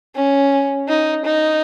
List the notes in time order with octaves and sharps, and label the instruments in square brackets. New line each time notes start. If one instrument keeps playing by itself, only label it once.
[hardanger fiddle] C#4
D#4
D#4